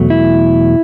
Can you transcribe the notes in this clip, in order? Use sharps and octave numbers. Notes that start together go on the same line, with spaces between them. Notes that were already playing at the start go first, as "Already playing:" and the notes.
Already playing: E2 B2 F#3 A3
E4